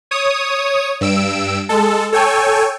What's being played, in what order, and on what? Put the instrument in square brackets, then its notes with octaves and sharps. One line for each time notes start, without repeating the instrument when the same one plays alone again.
[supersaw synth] C#5 D#6
G2 E6 D7
G#3 A4
A4 C#5 G5 G#5